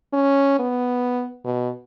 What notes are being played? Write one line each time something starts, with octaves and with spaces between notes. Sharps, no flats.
C#4
B3
B2